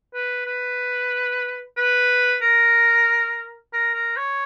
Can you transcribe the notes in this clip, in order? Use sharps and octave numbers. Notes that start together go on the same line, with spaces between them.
B4
B4
B4
A#4
A#4
A#4
C#5